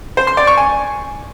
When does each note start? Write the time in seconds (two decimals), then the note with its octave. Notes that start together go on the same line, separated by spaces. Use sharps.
0.17 C5
0.27 C6
0.37 D5
0.47 C#6
0.57 G#5